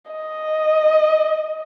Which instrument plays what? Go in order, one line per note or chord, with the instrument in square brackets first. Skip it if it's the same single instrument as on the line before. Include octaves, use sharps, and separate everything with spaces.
[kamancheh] D#5